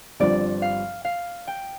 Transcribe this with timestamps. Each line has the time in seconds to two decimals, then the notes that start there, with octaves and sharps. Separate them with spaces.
0.20 G1 G2 F3 C4 F4 D5
0.62 F5
1.05 F5
1.47 G5